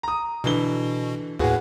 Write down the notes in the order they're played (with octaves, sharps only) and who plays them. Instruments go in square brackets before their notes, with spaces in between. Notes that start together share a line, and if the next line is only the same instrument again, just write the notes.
[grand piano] A#5 D#6
[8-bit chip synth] B2 [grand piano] D3 E3 G7
[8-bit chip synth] D#2 A2 [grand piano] B3 F#4 G#4